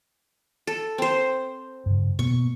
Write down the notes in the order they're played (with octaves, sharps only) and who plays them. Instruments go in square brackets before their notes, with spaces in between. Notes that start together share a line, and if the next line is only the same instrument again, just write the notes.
[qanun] A4
C4 C5
[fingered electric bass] G2 C#3
[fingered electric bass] B2 A#3 B3 [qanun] C#6